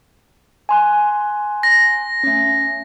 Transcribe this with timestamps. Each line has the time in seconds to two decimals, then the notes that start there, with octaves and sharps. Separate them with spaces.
0.69 G#5 C6 F#6
1.63 A#6
2.23 A3 C#4